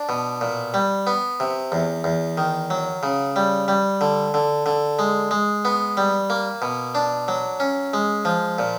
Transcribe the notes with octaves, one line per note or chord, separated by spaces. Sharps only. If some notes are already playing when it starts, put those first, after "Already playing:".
Already playing: D4
B2
A#2
G3
B3
C3
E2
E2
D#3
F#3
C#3
G3
G3
D3
D3
D3
G#3
G#3
B3
G3
A#3
B2
D4
F#3
C#4
G#3
F3
A#2